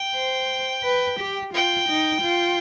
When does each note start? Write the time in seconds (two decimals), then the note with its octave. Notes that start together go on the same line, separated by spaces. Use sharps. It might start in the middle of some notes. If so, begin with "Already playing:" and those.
Already playing: G5
0.15 C5
0.84 B4
1.19 G4
1.53 F4 G5
1.88 D#4
2.23 F4